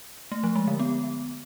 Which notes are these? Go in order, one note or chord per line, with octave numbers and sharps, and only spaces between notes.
A3
F3
G#3
D3
B3